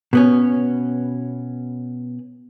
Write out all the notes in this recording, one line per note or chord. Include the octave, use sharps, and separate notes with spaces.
B2 B3 C#4